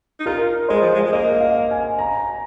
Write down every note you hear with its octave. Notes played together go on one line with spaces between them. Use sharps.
D#4
F4 A#4
G#3 C5
F3
G#3
G#3
A#3 D#5
F5
G#5
A#5